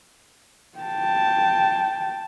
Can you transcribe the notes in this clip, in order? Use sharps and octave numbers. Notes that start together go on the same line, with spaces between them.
G5 A5